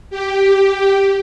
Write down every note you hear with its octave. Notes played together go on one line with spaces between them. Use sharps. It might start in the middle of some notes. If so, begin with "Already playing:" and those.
G4